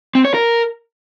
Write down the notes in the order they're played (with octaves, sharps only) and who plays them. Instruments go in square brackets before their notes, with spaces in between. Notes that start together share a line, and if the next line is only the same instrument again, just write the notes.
[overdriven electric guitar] C4
C#5
A#4